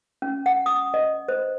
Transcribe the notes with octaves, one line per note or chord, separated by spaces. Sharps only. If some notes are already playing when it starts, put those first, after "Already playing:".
C#4
F#5
D#6
D#5
C5